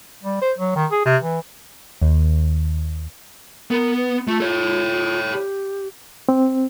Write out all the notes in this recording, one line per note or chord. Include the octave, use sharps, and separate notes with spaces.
G3
C5
F#3
D#3
G#4
C3
E3
D#2
B3 A#4
B4
A3 F4
A4 C#5
G4
C4